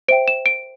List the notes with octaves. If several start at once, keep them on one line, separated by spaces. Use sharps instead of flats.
C5 E5 G5 D7
E7
D7